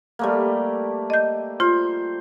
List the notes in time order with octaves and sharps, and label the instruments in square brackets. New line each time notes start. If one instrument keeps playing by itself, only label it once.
[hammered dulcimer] G3 A3 A#3
[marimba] D#5 G6
[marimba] F4 [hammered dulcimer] C5